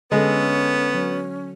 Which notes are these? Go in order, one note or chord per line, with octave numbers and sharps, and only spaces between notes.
D3 G#3 B3 C#4 A4
F#3